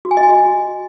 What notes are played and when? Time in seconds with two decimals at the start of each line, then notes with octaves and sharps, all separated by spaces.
0.05 F#4
0.11 G#5
0.17 D#5
0.23 G#5
0.29 F#4